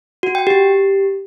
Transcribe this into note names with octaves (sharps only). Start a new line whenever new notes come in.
F#4
G5
G4